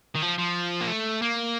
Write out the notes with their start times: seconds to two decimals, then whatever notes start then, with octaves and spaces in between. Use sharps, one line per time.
0.15 D#3
0.22 F3
0.38 F3
0.81 A#3
0.88 A3
1.22 A#3